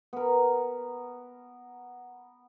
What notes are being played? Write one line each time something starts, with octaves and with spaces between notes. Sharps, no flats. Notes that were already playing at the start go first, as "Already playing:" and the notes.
B3 A#4